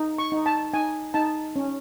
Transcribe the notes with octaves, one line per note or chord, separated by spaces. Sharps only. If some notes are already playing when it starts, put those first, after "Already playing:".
Already playing: D#4
C#6
D#4
A5
D#4 G#5
D#4 A5
C#4